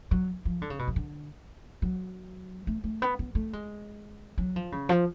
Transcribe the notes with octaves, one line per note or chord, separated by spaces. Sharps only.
F#3
F3
D3
C#3
B2
F2
D3
F#3
A3
A3
B3
B3
A3
G#3
F#3
F3
C#3
F3